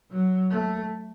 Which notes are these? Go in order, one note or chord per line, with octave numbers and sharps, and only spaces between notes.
F#3
A3